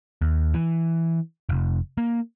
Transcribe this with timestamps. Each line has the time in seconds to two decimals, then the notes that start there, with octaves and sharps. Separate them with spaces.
0.22 D#2
0.54 E3
1.49 F1
1.98 A#3